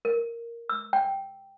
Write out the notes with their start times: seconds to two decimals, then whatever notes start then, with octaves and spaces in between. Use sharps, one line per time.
0.05 A#4
0.70 E6
0.93 G5